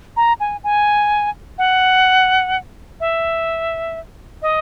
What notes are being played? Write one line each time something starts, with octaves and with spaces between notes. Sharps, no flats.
A#5
G#5
G#5
F#5
E5
D#5